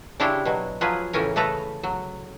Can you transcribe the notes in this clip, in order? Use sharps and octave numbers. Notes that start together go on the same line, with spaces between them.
C#3 D4 E4 G4 C5 C#5
B2 F#3
F3 F#3 F4 G#4 B4
A2 C#3 E3 C#4 A#4
C#3 A3 A4 B4 A#5
F#3